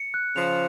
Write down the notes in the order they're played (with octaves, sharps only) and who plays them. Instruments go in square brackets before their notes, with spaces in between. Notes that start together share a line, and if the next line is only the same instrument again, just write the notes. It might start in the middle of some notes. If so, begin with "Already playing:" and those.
Already playing: [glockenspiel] C#7
F#6
[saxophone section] C#3 F3 [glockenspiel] F7